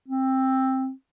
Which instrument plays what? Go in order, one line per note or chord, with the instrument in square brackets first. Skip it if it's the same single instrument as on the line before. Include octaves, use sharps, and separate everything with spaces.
[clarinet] C4